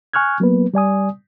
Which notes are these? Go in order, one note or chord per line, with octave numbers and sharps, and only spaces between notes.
G#5 C#6 F6 F#6 G#6
F#3 A#3 B3 B4
G3 D5 G#5 D#6